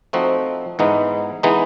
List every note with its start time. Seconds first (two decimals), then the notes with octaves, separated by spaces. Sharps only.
0.13 F3 A3 C4 D#4 F#4
0.79 G#2 E3 G#3 B3 D#4
1.43 E3 G#3 B3 D#4